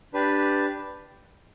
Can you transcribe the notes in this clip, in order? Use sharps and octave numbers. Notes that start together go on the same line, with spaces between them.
D4 G4 B4 D5